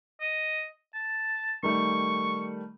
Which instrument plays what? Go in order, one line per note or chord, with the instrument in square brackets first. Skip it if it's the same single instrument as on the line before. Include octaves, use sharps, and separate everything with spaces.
[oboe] D#5
A5
[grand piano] D#3 G3 A3 [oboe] C#6